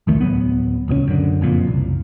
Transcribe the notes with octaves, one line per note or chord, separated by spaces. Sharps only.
E1 C2 D#3 A3
D1 F2 F#3 B3
D#1 C#2 G#2 C#4
F#2 D3
F#1 F2 A#2
F#1 C2